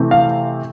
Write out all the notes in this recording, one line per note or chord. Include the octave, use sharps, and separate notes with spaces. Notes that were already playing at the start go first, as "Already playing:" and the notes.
Already playing: C3 E3 A3 C4
F5